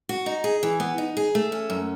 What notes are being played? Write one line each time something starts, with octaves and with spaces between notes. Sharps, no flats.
F#4
D#4
G#4
E3
B3
D#4
G#4
A3
C#4
F#2